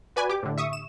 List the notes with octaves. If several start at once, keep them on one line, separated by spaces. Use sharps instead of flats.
F#4 B4 D5 G#5
G4 D6
A2 D3
E5 C#6 D#6
E7